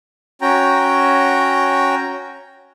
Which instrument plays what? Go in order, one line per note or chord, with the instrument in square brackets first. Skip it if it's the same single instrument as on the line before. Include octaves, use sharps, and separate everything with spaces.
[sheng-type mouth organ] C#4 F#4 G5 A#5